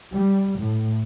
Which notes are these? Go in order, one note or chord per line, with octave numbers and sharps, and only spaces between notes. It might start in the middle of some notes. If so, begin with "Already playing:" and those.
G3
A2